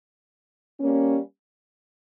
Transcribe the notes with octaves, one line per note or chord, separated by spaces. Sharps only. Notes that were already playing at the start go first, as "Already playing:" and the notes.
G3 A#3 C#4